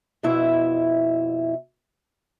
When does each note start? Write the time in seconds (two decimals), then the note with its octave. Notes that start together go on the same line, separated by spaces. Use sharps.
0.23 F2 B2 E4 E5